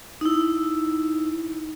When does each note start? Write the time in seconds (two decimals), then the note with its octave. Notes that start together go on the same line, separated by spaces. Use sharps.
0.21 D#4 E4